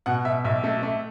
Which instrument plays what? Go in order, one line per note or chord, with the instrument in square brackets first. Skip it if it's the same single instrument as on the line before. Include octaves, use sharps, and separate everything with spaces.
[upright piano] B2 F#5
B2 E5
B1 E5
A3
A3